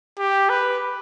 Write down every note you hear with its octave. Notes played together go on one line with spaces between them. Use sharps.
G4
B4